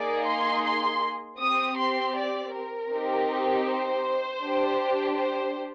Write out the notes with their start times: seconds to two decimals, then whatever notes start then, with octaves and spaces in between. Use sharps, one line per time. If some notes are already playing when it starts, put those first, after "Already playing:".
Already playing: A#3 D#4 G#4 D5
0.26 C6
0.64 C6
1.39 C4 G4 D#6
1.77 C6
2.15 D5
2.53 A#4
2.91 C4 D#4 G4
3.66 C5
4.42 D4 G4
5.18 C5